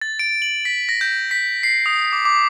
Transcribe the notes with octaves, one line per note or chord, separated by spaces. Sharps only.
A6
D7
F#7
B6
A#6
G6
B6
C7
D#6
D6
D6